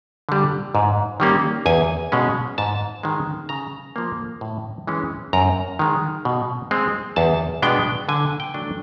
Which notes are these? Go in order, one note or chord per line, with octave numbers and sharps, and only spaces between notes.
D3 G3
G#2
D#3 G3 A#3 C#4
E2 G#5
B2 G#3 C#4
G#2 A5
D#3 G#3
C#3 A#5
F3 A#3
A2
E3 G#3 C#4
F#2 A#5
D#3 G#3
B2
G#3 C4
E2 A5
B2 G#3 B3 D4 G5
D3 G#5
G5
F#3 A3 D4